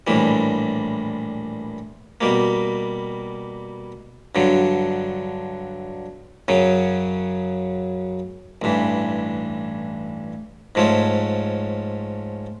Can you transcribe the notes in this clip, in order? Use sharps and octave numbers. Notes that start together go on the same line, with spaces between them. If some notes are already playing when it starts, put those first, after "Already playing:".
A#1 A2 E3 G3
B2 G3 A#3
G2 D3 F#3
F#2 C#3 F#3
A1 G2 E3
G#2 F3 A3 C#4